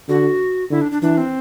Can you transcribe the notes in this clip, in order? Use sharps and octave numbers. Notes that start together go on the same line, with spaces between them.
D3 F#4
D3 E4
D4
D4
E3 D4
C4